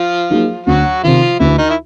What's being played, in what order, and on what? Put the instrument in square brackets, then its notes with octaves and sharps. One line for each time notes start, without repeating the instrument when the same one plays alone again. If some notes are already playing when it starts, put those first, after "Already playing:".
Already playing: [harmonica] F3 F4
[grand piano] F#3 A#3 D#4 G#4
[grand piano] D2 [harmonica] F#3 F#4
[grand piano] C3 D#3 [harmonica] F3 F4
[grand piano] D2 [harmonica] E3 E4
[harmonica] D#3 D#4
E4